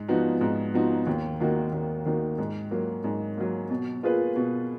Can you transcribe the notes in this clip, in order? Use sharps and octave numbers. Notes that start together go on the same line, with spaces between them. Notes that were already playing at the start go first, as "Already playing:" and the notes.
Already playing: G#2
F3 B3 D#4 F#4
G#2
F3 B3 D#4 F#4
D#2
D#3 A#3 D#4 F#4
D#2
D#3 A#3 D#4 F#4
G#2
F#3 A#3
G#2
F#3 A#3
B2
A#3 F4 G#4 B4
B2